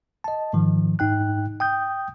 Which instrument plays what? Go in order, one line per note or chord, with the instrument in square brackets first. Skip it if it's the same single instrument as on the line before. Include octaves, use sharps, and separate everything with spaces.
[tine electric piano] D#5 A5
G#2 D#3 F3
G#2 D#4 G5 F#6
G5 D#6 G6